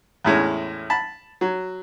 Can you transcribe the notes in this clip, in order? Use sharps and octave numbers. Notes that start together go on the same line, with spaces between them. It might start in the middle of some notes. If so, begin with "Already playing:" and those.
E2 A2 G#3 C#4
A5 B5
F#3